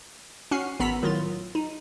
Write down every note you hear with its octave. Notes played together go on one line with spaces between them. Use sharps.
C#4 F#4 F#5 F6 C7
G#1 B3 A#5 B5 E6 B6
A2 D#3 F#3 F4 A6
D#4